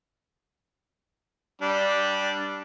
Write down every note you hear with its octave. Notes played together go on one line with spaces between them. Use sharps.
G3 D4